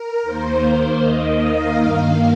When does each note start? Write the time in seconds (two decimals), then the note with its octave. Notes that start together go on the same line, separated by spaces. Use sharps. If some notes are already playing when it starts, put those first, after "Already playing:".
Already playing: A#4
0.23 D#2 D#3 A#3 C5
0.62 C5
1.01 D#2 D#3 A#3 D#5
1.41 F5
1.80 G2 D#3 A#3